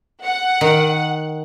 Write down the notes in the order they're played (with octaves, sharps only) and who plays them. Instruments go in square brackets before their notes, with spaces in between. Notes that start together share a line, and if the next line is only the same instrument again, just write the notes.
[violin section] F#5
[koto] D#3